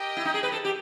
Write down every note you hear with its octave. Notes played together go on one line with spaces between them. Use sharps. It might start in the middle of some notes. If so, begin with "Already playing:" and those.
Already playing: G4 A#4 D#5 G5
E4
D#4
G#4
B4
A4
G4